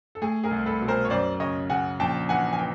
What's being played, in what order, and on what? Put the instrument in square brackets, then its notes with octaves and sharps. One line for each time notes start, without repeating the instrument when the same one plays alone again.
[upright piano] A4
[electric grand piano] A3 [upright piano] G#4
[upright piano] G#4 A#4
[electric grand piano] C2
[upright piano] A4 B4
[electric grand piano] B2
[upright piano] A#4 C5
C#5
[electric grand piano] F#2 [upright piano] C5 D5
[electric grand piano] C#3 [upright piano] C#5 D#5
[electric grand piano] C#3 [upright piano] F#5 G#5
[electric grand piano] A#1 [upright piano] G5 A5
[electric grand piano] E3 [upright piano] F#5 G#5
[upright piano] G#5
[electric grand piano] E3 [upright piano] G5